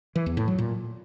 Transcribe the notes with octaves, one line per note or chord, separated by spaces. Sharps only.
E3
E2
A2
F#3
A#2